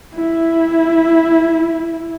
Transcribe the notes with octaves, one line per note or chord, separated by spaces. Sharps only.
E4